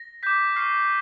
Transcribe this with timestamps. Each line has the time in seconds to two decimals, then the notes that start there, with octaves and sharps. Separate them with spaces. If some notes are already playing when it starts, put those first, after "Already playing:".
Already playing: A#6
0.23 D6 G6 B6
0.56 C#6 F6 C7